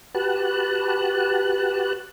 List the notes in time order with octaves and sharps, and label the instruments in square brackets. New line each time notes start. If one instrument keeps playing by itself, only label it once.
[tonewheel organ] F#4 G4 B4 A5 F#6